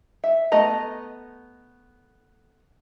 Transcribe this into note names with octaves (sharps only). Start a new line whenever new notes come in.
E5
A3 B3 D#5 A#5